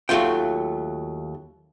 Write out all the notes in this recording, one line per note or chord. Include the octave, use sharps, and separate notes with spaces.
D#2 F#3 A3 F4 G5